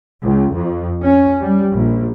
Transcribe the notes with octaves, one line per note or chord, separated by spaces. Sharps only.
C#2
F2
C#4
G3
A#1